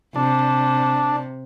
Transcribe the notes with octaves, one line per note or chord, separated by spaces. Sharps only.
C3 D4